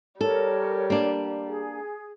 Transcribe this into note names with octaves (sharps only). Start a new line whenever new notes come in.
G3 A4 A#4 C#5
A#3 D4
G#4